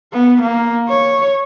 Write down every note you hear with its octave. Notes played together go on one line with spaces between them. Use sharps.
B3
A#3
C#5